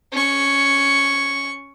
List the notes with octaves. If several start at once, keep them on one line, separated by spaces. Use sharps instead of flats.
C#4 C#6